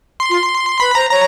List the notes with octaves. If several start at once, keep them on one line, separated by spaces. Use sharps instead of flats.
C6
F4
B4 B5
C5 A#5
C#5 A#5